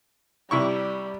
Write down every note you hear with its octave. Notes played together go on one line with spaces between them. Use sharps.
C3 G3 E4 C#6